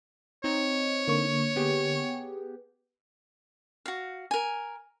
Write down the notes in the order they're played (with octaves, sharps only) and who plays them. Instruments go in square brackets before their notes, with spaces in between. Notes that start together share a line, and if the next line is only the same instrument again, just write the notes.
[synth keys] C4 D#4 [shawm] C#5
[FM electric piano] D3 A#3 C#6
[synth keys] B3 G4 G#4
[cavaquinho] F#4 F5
A#4 G#5